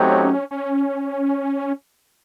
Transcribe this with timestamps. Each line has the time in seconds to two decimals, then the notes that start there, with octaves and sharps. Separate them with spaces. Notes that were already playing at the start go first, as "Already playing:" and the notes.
Already playing: F#3 A3 C4 C#4 D#4 G4
0.51 C#4